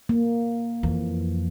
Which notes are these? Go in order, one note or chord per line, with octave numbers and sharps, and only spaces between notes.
A#3
F2 E3